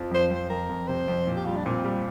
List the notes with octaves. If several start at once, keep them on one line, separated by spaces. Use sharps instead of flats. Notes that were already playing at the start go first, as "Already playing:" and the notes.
Already playing: F2 F3
F2 C5
F2 C5
F2 A#4
F2
C3 C5
F2
A#2
G4
G3 F4
D4
A#2 C4
G3